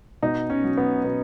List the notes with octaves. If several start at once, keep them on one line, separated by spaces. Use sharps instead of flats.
B2 D#4
C#4
F#3
B3
B2 B3